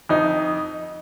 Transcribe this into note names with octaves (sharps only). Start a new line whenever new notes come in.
F2 D#4